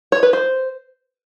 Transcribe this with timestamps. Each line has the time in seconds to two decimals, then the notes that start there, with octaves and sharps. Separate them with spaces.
0.12 C#5
0.23 B4
0.33 C5